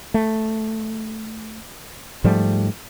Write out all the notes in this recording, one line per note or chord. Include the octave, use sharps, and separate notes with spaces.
A3
G#2 F3 G3 A3